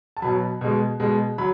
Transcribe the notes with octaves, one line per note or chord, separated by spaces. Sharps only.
A5
B2 F#3 B5
B2 G#3
B2 G#3
F#3 B5